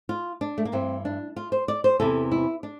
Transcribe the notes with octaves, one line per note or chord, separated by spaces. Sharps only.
F4
D4
A3
A#3
G2 E3 C4
D4
F4
C5
D5
C5
E2 C3 E3 A4
E4
D4